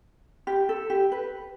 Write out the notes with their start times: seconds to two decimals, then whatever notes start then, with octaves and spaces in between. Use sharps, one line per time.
0.47 G4
0.69 A4
0.90 G4
1.12 B4